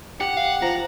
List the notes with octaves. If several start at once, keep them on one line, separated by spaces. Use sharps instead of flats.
G4 F#5
F5
F3 A#5